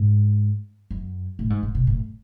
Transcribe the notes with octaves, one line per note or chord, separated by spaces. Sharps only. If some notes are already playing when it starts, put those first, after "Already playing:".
Already playing: G#2
F#2
A2
G#2
A2
B2
A2